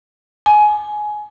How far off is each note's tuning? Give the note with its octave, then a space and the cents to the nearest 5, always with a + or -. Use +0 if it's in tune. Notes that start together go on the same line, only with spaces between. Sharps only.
G#5 +20